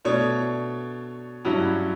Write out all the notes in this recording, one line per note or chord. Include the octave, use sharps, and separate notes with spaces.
B2 A3 D4 C#5
G2 F#3 C#4 E4